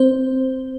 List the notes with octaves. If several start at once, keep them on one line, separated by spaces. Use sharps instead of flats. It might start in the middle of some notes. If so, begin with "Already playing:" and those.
Already playing: C4 C5